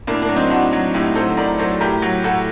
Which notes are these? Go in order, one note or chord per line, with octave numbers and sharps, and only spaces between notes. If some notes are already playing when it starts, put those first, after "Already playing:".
A2 A#3 D4
A#3 D4
F#3
C4 D#4
A2 D4 F#4
F#3
A2 D#4 G4
F#3 A4 C5
A2 A#4 D5
F#3 A4 C5
A2 G4 A#4
F#3
A2 F#4 A4